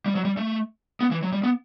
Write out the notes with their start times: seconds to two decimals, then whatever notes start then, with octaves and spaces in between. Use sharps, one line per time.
0.06 G3
0.15 F#3
0.25 G3
0.37 A3
1.01 B3
1.11 E3
1.23 F#3
1.32 G3
1.43 B3